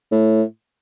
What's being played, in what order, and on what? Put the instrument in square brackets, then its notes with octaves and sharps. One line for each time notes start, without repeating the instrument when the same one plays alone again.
[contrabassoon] A2